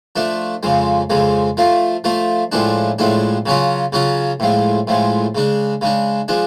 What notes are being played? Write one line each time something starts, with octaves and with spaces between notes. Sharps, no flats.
F3 A3 D4
F2 C#3 F3 G#3
F2 C#3 F3 G#3
F3 A3 F4
F3 A3 F4
A2 F3 G#3 D4
A2 F3 G#3 D4
C#3 F#3 C#4 F4
C#3 F#3 C#4 F4
A2 F3 G#3
A2 F3 G#3
C#3 G#3 D4
C#3 G#3 D4
F3 G#3 D4